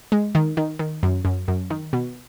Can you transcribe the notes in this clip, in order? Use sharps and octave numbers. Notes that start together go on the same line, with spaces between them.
G#3
D#3
D#3
D#3
F#2
F#2
F#2
D#3
B2